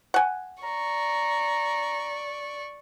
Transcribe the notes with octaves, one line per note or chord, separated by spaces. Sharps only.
F#5 G#5
D5 A#5 C#6